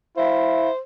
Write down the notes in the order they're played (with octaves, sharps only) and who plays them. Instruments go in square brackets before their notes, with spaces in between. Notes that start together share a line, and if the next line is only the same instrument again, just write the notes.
[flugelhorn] E4 [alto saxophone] C5 [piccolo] E5 [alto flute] F5